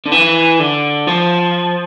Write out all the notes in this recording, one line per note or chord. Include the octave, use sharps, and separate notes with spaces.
D3
E3
D3
F3